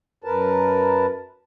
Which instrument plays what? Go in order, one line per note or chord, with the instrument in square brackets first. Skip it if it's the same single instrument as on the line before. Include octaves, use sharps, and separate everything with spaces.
[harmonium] F#2 A#4 B4 A5